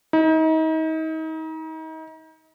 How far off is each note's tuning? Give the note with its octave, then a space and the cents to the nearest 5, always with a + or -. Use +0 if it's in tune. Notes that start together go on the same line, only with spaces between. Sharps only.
D#4 +35